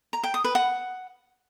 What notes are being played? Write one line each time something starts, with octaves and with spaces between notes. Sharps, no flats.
A#5
G5
D#6
B4
F#5